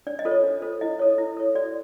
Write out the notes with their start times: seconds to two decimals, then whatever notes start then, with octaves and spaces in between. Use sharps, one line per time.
0.07 D4 D5
0.19 D#5
0.25 F4 A4 C5
0.31 C#5
0.44 D4
0.62 F4 A4 C5
0.81 E4 D#5
0.99 A4 C#5
1.18 E4
1.37 A4 C#5
1.55 F#4 D5